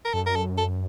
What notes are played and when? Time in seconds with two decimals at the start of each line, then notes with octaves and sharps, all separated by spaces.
0.05 A#4
0.14 F#2 A4
0.26 A#4
0.36 A4
0.58 A4